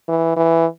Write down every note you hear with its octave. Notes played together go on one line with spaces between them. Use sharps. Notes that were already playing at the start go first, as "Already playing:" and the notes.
E3
E3